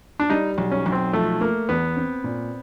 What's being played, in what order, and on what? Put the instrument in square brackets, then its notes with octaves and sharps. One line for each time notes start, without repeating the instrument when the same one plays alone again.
[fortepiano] D4
[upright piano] G3 [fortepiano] D#4
[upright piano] B1
[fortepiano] C#4
[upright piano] B1
[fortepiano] C4
[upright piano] F3 [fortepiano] A3
[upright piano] A3 [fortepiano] A#3
[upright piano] E2 [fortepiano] B3
[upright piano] C4
A#2